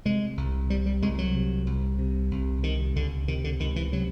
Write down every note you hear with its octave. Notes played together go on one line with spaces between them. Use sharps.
C3 G#3
C2
C3 G3
G3
C2 G#3
F#3
C3
C2
C3
C2
C3 D#3
C#2 D3
C3 D#3
D3
C#2 D#3
E3
C3 F#3